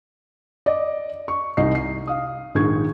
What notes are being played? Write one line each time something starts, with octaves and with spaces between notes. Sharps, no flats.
D5 D#5
C#6
C2 D#4 D#5 C7
C7
F5 D#6
A#1 G#2 D#3 G#4 C#6 G#6